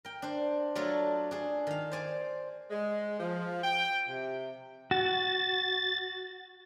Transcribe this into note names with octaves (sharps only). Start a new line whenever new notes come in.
A#4 G5
D4 C5
F#3 A3 D4 F4 A4 C#5
D4 G#4
D#3 F5
C5 D5 G#5
G#3
F3
G5
C3
F#4 A6